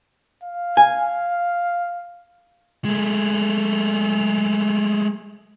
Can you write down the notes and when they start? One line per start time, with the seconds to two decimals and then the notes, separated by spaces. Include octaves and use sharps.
0.44 F5
0.77 G#5
2.85 G#3 A3